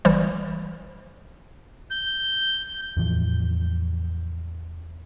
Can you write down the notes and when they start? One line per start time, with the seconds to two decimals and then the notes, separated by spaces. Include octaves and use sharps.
0.05 G1 E3 G3 C5
1.91 G6
2.97 E2 A2 E3 F3